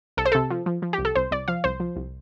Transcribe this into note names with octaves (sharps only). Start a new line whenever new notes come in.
C2 A4
C5
C3 A4
F3
F3
F3
G4
C2
A4
C2 C5
C2 D5
F3 F5
C2 C5
F3
C2